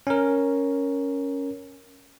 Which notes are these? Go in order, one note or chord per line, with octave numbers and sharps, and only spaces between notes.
C#4 A#4